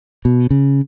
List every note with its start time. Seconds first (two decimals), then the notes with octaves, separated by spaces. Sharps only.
0.25 B2
0.51 C#3